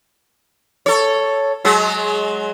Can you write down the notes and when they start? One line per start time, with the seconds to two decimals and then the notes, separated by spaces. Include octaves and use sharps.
0.86 A4 C#5
1.65 F#3 G#3